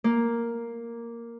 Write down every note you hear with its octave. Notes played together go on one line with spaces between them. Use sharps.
A#3